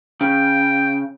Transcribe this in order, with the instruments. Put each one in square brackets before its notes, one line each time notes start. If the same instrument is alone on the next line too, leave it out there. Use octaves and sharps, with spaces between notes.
[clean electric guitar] C#3 [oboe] G5